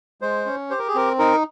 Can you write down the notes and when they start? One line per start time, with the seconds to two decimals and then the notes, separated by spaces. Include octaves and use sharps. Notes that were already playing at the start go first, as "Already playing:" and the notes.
0.21 G#3 C5
0.46 C#4
0.70 G4 C5
0.79 A#4
0.88 G#4
0.95 C4 A#4
1.19 D#4 A#4